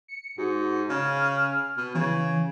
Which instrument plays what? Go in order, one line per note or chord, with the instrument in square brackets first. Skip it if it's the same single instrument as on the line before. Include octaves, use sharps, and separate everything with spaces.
[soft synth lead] C#7
[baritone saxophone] G#2 [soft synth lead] F#4
[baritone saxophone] C#3 [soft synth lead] F6
[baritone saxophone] B2
[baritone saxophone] C#3 [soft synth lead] E3